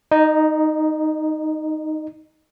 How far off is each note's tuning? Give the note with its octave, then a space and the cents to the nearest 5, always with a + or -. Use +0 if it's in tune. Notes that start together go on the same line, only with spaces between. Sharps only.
D#4 +0 D#5 -35